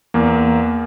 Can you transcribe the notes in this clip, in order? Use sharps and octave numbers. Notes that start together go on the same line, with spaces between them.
E2 A#3